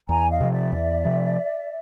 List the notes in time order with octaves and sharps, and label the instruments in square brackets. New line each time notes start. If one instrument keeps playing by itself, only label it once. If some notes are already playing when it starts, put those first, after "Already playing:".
[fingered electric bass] E2 [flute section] G#5 A#5
[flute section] D#5 F5
[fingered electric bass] C3 F3
[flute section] D5 E5
[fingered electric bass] E2
C3 F3